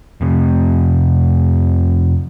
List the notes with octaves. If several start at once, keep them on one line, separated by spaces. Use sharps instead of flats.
F2 C3